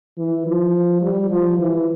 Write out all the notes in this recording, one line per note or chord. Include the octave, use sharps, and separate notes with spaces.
E3
F3
G3
F3
E3